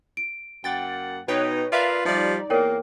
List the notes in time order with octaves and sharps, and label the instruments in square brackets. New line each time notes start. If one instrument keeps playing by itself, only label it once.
[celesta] D7
[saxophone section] F#2 A#3 F#5 [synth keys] G5 A6
[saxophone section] B2 D#4 [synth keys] B4 C#5 G5
[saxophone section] F4 A#4 B4 [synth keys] D5 E5 F5
[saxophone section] F3 G3 [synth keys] D#4 D5
[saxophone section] E2 A#3 [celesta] A#4 C#5 G5